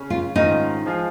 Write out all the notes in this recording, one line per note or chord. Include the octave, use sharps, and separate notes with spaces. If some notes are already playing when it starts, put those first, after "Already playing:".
Already playing: C#3 C#4
F4
G#2 D#3 C#4 D#4 F4
F3 G#3 F4 G#4